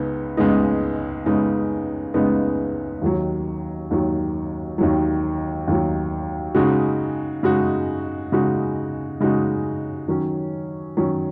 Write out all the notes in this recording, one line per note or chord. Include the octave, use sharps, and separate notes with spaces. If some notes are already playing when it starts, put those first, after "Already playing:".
Already playing: C#2 C#3 B3 D#4
C#2 C#3 G#3 B3 D#4
C#2 C#3 G#3 B3 D#4
C#2 C#3 G#3 B3 D#4
D#2 D#3 F#3
D#2 D#3 F#3
D#2 D#3 F#3
D#2 D#3 F#3
C#3 G#3 D#4 F#4
C#3 G#3 D#4 F#4
C#3 G#3 D#4 F#4
C#3 G#3 D#4 F#4
D#3 F#3 C#4
D#3 F#3 C#4